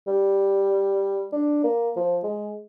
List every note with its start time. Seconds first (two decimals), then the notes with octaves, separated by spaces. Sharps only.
0.07 G3
1.33 D4
1.64 A#3
1.97 F3
2.24 G#3